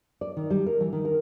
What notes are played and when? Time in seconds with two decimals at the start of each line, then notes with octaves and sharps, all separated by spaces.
0.21 D5
0.37 D#3
0.50 G3
0.66 A#4
0.81 E3
0.93 D#3
1.05 A#4